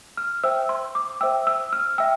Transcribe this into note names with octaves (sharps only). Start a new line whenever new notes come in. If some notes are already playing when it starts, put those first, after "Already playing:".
F6
C5 E5 G5 E6
C6
D6
C5 E5 G5 E6
E6
F6
E5 G5 E6